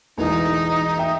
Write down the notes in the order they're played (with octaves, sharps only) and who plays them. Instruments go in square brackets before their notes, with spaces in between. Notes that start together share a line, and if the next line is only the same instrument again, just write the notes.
[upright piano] E1 A1 E3 [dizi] D#4
[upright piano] E5 G5